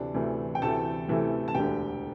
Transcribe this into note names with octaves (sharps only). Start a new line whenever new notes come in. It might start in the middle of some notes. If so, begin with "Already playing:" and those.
Already playing: D2 C3 E3 A3 D4
D2 C3 E3 A3
G5
D2 C3 E3 A3 A4 A5
D2 C3 E3 A3
A5
E1 D2 D3 G4 G5